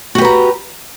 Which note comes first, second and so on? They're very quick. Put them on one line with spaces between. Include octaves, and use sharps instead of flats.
F#4 G4 B4 A#5